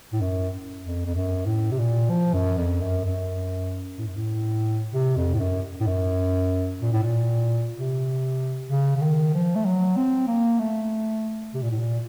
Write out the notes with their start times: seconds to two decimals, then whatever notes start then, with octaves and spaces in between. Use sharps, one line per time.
0.13 A2
0.21 F#2
0.84 F2
1.06 F2
1.15 F#2
1.46 A2
1.72 C3
1.79 A#2
2.09 F3
2.34 F#2
2.58 F2
2.81 F#2
3.05 F#2
3.98 A2
4.07 F#2
4.16 A2
4.93 C3
5.17 F2
5.34 A2
5.40 F#2
5.80 A2
5.87 F#2
6.82 A#2
6.93 A2
7.03 A#2
7.77 C3
8.70 C#3
8.97 C#3
9.02 D#3
9.34 F3
9.56 A3
9.65 F#3
9.97 C4
10.27 A#3
10.59 A3
11.54 C3
11.63 A#2
11.71 A2
11.79 A#2